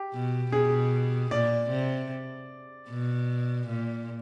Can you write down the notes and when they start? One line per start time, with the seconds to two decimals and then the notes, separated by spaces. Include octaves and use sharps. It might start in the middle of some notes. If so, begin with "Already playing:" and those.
Already playing: G4
0.13 B2
0.52 B2 G#4
1.31 A#2 D5
1.70 C3
2.89 B2
3.68 A#2